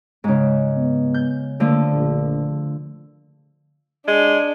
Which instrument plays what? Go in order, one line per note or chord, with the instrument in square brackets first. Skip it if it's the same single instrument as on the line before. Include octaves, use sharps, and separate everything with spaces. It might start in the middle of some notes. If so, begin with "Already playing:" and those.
[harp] G#2 C#3
[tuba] B3
[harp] G6
[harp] D3 F3 A3 [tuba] A#3
[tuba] A#1
[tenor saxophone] G#3 [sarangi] D4